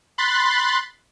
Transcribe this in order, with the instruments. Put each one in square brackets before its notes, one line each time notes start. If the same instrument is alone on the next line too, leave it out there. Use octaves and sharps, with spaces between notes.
[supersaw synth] B5 C6 F#6 A6